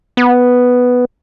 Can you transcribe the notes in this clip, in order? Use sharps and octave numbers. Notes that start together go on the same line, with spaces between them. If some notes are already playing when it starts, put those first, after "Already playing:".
B3